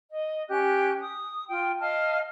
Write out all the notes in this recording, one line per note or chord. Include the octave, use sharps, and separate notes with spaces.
D#5
C#4 G4 F#6
D#6
F4 G5
D#5 F5 A5 F6